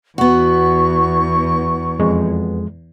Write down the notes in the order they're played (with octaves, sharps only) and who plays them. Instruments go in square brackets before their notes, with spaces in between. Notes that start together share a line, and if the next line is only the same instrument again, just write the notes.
[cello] E2 [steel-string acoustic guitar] B3 F#4 [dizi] C#6
[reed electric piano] F2 G#3